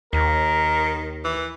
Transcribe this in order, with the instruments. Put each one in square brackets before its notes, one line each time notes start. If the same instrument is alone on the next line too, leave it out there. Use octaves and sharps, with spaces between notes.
[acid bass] D#2 [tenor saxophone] D#3 [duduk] A#4
[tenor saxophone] E3